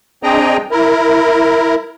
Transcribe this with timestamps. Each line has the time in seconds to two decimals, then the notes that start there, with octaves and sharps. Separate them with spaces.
0.23 C4 D4 G#4 D#5 G5 A#5
0.71 E4 A#4